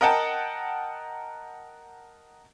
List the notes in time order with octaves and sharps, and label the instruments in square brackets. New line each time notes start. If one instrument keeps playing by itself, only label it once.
[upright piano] A#4 D#5 F#5 G5 A5